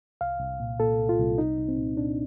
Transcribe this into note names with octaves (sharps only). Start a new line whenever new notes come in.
C2 F5
C2
A#2
A#2 A4
C2
F4
C2
C2 D#4
C2
C4
A#2
A#2 D4